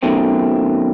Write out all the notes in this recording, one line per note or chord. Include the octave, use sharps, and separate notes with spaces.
F#2 B2 D#3 A3 C4